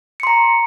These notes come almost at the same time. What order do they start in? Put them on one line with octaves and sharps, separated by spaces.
C#7 C6 A#5